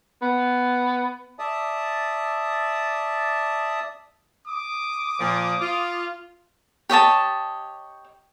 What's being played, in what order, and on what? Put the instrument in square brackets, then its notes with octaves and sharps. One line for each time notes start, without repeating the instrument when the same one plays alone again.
[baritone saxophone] B3
[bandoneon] D5 E5 A5 D#6
[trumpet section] D6 D#6
[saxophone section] A#2 F3
F4
[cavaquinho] G4 C#5 D#5 A5